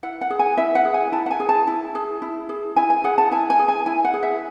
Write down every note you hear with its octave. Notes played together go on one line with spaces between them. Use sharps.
E4 F#5
F#5
G#4
G#5
E4 E5
F#5
G#4
G#5
E4 A5
F#5
G#5
G#4
A5
E4
G#4
E4
G#4
E4 G#5
G#5
G#4 F#5
A5
E4 G#5
G#5
G#4
G#5
E4 G#5
F#5
G#4
E5